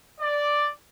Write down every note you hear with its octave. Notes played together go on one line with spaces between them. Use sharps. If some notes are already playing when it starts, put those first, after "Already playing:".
D5